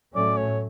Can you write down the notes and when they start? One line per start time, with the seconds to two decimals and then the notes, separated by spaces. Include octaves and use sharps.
0.15 A2 F#3 A3 C#4 D5
0.37 C#5